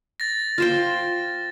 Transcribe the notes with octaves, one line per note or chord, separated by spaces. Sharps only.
A6 A#6
F4 C5 G5